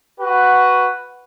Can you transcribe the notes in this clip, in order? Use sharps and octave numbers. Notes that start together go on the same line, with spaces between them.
F#4 B4